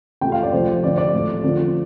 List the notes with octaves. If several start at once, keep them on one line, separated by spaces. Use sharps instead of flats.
C3 A3 F4 G5
F5
D5
C3 F3 A3 F4 C5
D3 F3 C4 F4 D5
D5
A2 A3 C4 F4
D3 F3 C4 F4